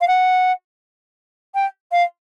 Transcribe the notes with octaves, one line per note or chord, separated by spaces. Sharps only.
F5
F#5
G5
F5